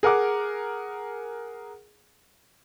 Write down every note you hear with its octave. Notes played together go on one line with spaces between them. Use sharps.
G#4 A#4 F#5 D6